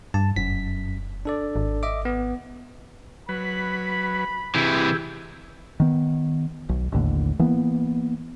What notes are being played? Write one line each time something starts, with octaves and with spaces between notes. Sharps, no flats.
G2 A5
F1 F#2 B6
D4 A4 D5
G#1
D#5 E5 D6
B3
F#3 B4 B5
C3 E3 E4 G4 G#4
D#3 B3
B1
A1 D#2 A2 D3
E3 A#3 B3